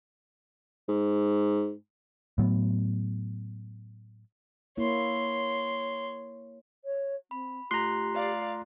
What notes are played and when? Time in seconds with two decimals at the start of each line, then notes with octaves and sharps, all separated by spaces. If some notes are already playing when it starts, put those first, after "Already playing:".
0.88 G#2
2.38 A2 F#3 B3
4.78 A#3 E4 C#5 C6
6.85 C#5
7.31 C4 B5
7.71 A3 F4 G4 A#5 C6 F#6
8.14 D5 F5